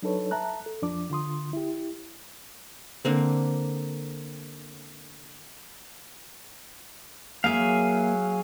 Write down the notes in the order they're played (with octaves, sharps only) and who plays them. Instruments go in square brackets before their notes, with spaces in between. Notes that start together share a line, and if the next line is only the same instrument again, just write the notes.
[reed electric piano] F#3 D4 D#4 A4 B4 C#5
E5 A5 A#5 F#6
A4
F2 F3 D4 D6
D3 F4 C6 D#6
E4 G4
[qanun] D3 A#3 C4
[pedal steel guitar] F#3 G#4 F5 [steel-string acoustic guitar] A#3 E5